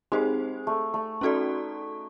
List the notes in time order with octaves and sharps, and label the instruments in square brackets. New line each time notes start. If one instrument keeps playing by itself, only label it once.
[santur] G#3 [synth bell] C4 D#4 G4 C5
[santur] A3
A3
[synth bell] C#4 F#4 A4 D5 [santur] D#4